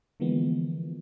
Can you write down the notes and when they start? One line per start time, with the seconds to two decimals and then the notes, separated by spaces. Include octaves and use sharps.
0.20 D3 E3 F3 G#3 A#3 B3